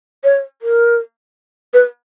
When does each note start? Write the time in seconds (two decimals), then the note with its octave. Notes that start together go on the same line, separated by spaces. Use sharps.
0.24 C#5
0.62 A#4
1.74 B4